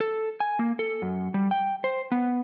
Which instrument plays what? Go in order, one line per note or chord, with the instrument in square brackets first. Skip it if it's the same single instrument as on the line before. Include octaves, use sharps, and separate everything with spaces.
[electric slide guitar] A4
G#5
A#3
A4
F#2
G3
G5
C5
B3